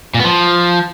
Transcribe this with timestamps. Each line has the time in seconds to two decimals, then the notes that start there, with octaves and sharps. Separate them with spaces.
0.14 A#2
0.19 B3
0.25 F3